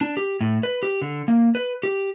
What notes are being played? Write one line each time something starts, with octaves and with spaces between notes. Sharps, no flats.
D4
G4
A2
B4
G4
D3
A#3
B4
G4